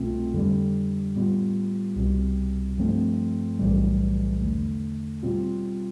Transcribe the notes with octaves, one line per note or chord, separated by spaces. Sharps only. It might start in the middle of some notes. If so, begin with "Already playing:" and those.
Already playing: C2 B2 A3 C4 F4
F2 D3 G3
A2 G3 B3 F4
C2 B2 G3 C4
G2 F3 A3 C4
B1 A2 E3 G3
E2 D3 A3
B2 G3 C4 F4